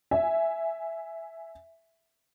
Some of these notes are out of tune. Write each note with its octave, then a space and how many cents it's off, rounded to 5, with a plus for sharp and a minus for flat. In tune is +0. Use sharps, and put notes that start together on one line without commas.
E5 +0 G#5 +5